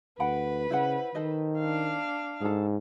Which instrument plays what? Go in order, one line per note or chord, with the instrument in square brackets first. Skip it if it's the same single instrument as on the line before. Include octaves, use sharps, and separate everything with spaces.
[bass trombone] D2 [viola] B4 [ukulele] F#5 G5 B5
[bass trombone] C#3 [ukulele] E4 C5 F#5
[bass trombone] D#3 [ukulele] A4 C5 D#5
[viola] D4 F5
[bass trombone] G#2 [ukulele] G#4 A4